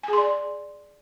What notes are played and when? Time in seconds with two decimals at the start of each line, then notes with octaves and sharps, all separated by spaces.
0.03 G#5
0.08 G#4
0.13 C6
0.18 D5